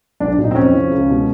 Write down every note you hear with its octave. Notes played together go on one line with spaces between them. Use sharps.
B1 D4
A#2 F#3
D#4
C4
F2 C#4
C#3 F3
C#2
B2 G#3